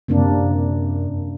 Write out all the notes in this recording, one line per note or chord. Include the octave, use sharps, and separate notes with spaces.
F#2 C3 A#3 D4